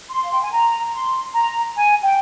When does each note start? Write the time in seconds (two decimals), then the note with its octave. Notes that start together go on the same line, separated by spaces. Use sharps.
0.10 C6
0.24 F5
0.32 G5
0.42 G#5
0.52 A#5
0.93 C6
1.34 A#5
1.76 G#5
2.03 G5